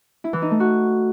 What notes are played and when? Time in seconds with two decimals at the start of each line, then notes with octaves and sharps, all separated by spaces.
0.24 E4
0.33 E3
0.42 D#4
0.51 A3
0.60 F#4